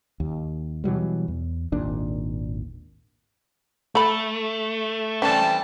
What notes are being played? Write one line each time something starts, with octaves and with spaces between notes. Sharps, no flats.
D#2
B2 E3 F#3 G3
E2
G#1 D#2 A#2 D4
A3 A4 B5
E3 G3 C4 C#4 A4 D5 A5